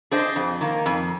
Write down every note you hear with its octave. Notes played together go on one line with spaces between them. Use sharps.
D4 G#4 C5 D#5
F2
D#3 A#3
F2